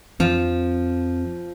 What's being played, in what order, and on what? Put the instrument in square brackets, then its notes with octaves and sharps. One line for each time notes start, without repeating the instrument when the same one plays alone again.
[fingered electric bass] F2 [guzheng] F3 [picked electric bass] C4